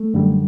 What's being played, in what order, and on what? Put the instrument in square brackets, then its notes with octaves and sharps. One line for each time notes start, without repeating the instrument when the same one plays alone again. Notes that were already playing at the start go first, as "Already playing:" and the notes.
Already playing: [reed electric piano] A3
F#2 D3 G3